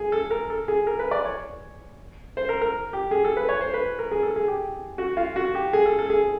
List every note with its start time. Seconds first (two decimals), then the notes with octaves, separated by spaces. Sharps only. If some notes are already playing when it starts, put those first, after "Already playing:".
Already playing: G#4
0.12 A4
0.31 A#4
0.50 A4
0.68 G#4
0.87 A#4
0.99 B4
1.11 D5
1.25 C#5
2.37 C5
2.49 A#4
2.61 A#4
2.93 G4
3.11 G#4
3.24 A4
3.37 B4
3.49 C#5
3.61 C5
3.74 B4
3.99 A#4
4.11 G#4
4.23 A4
4.36 G#4
4.48 G4
4.98 F#4
5.17 F4
5.36 F#4
5.55 G4
5.73 G#4
5.86 A4
5.99 A4
6.10 G#4